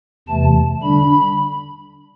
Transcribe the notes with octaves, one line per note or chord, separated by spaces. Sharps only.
E2 C3 E3 A3 A5
D3 G3 D4 B5